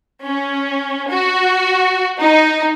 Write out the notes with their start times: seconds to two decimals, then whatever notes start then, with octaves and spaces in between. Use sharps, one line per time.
0.24 C#4
1.11 F#4
2.21 D#4